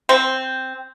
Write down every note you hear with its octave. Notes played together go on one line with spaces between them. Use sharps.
C4